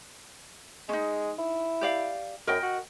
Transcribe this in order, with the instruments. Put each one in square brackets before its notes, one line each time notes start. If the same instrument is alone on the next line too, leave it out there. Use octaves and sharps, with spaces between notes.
[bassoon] G#3 [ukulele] C#4 D#4
[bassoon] E4
[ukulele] G4 D5 F5
[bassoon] F#2 [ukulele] A#4 D#5 G5
[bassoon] F#4